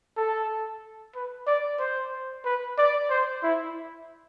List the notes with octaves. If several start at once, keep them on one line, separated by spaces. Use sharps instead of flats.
A4
B4
D5
C5
B4
D5
C5
E4